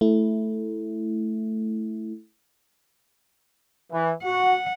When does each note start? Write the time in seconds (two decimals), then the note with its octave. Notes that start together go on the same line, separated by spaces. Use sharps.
0.01 A3 E4
3.92 E3
4.24 F#4 F#5